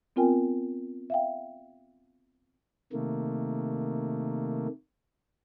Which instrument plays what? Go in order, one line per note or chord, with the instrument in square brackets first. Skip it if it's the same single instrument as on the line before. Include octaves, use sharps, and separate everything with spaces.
[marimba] B3 C4 F4 A#4 G5 G#5
E5 F5 G5
[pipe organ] C3 D#3 A3 A#3